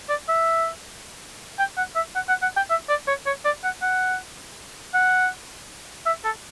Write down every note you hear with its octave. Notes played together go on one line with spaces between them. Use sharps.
D5
E5
G5
F#5
E5
F#5
F#5
F#5
G5
E5
D5
C#5
C#5
D5
F#5
F#5
F#5
E5
A4